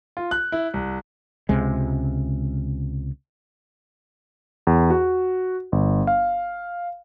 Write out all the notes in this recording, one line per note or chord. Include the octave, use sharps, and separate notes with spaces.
F4
F#6
E4
C2
C#2 C3 G#3
E2
F#4
G1
F5